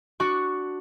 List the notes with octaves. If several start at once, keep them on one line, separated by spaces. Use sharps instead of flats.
D4 F#4 C#6